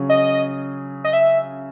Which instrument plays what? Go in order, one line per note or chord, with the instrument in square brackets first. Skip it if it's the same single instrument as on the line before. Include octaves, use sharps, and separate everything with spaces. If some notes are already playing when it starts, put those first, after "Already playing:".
Already playing: [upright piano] C#3 F#3 C#4 G#4
[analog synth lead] D#5
D#5
E5